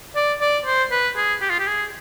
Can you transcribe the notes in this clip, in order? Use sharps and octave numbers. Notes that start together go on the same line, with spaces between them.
D5
D5
C5
B4
G#4
G4
F4
G4
G#4